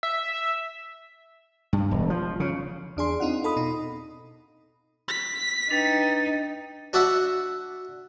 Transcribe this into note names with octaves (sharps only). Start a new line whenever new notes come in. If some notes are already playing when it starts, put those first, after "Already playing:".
E5
G2
E1
F3
C#3
E2 D4 G#4 C6
C4 D#4 F4 F#5
A4 B5 D#6
B2 D#4
B6
D4 D#4 B4 G5 A6
D4 F#4 D5 E5 F#5